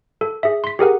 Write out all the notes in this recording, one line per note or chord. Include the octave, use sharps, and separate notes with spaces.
A4
G#4 E5
C6 B6
G4 G#4 A#4 F#5